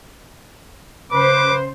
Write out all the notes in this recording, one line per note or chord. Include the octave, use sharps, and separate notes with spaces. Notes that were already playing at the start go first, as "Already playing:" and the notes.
C#3 B4 C5 D6